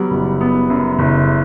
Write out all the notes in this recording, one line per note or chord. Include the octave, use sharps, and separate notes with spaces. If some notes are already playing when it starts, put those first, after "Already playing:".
Already playing: F#3 G3 B3
F#1
B3
F#2
F#1